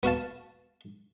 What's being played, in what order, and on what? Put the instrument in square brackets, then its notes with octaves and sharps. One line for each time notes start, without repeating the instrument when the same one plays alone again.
[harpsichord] B3 F#4 F5 A5